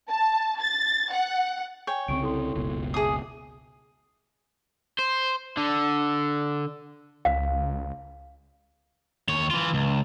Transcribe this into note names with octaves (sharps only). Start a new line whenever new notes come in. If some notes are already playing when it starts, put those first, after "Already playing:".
A5
A6
F#5
C#5 G5 G#5
C2 C#3 C4 C#6 D7
E4 A4 C6
F#1 C#2 B2
G#4 E5 D6 D#6 C7
C5
D3
C#2 F5
D#2 C#5
E3 F4
C#2